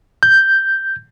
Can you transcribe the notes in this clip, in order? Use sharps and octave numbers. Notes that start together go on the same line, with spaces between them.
G6